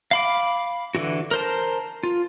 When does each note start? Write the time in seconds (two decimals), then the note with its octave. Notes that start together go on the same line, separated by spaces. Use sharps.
0.11 F5 B5 D6
0.95 D3 E3 F#4
1.31 A#4 C5 A5
2.03 F4